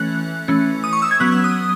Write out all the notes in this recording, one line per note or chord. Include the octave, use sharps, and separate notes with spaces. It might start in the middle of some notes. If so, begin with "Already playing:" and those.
Already playing: E3 A3 C#4 F#6
E3 A3 C#4
D#6
C#6
E6
G#6
F#3 B3 F#6
E6
D#6